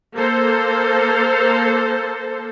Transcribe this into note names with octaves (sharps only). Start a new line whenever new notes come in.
A#3 A4 C5